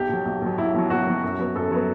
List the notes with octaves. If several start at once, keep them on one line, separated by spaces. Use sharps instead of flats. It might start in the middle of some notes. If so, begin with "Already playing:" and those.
Already playing: B1 G4
B2 F#3
B1
B2 F#3
B1 E4
B2 F#3
B1 F#4
B2 F#3
F#2
F#3 B3
F#2 A4
F#3 B3